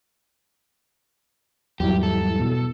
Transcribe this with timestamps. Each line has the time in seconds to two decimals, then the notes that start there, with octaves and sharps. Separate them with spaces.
1.80 E2 G#2 F#3 G3 E4 G4
2.03 A4
2.39 B2